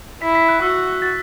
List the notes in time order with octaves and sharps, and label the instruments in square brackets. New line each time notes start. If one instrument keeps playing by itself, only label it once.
[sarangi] E4 [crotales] B6
[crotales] B6
F#6
[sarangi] F#4 [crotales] E6
[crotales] A6